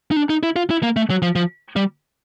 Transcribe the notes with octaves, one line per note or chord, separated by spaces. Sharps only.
D#4
D4
D#4
E4
F4
E4
A#3
A3
F#3
F3
F3
G3